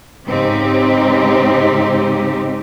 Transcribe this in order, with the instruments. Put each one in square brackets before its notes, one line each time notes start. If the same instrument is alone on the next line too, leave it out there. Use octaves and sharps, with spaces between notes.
[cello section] G#2 C#3 G#3 C4 D#4 G4